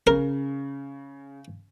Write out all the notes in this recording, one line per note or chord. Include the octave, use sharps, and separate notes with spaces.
C#3 A#4